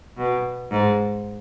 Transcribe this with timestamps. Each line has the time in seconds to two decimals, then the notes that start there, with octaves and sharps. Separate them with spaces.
0.17 B2
0.70 G#2